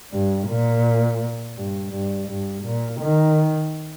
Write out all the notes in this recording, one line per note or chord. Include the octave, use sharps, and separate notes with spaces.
G2
A#2
G2
G2
G2
A#2
D#3